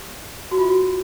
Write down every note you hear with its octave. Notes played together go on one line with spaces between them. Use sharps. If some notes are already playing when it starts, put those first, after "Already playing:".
Already playing: G4
F#4
F4
F#4